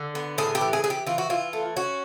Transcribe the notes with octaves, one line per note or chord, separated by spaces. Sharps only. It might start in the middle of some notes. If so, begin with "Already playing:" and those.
Already playing: D3
B3
A2 G#4
G4
E3
G#4
E3 G#4
G4
E3 F4
F#4
E3 F4
A3
C#4 F#4